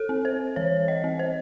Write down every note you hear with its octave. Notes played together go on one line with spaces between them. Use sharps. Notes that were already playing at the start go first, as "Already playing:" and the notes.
Already playing: A4
C4
C5
E3 C#5
D#5
C4
C5